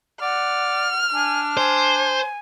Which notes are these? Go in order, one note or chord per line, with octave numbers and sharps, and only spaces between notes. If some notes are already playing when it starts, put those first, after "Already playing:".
D5 F#5 F6
D4 G#5
C5 G#5